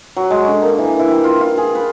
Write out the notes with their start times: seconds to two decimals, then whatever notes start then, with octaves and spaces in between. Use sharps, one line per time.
0.16 F#3
0.30 G#3
0.48 D3
0.62 A#3
0.78 E3
0.99 E4
1.11 G4
1.24 F4
1.41 F4
1.58 G#4
1.75 B4